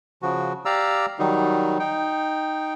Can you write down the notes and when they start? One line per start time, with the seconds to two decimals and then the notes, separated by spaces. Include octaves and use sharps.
0.22 C#3 F3 F#4
0.65 G4 D5 F5 A#5 E6
1.19 D#3 F#3 G3 D#4
1.79 D#4 G5